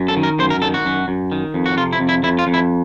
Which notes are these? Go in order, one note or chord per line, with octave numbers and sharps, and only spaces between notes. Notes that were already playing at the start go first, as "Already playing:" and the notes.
Already playing: F#2
A4
D#3
A#4
F#2 C5
A#4
D#3 A4
F#4
F#2
F#2
D#3
F2
F#4
C3 F4
E4
F2
E4
F2 E4
F4
F2
E4